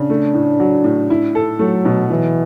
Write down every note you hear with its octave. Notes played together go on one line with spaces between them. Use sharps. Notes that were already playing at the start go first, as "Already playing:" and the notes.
Already playing: C#3 D4
A3
A2
F#3
A2
E4
A4
F#3 A3
B2
E3 F#3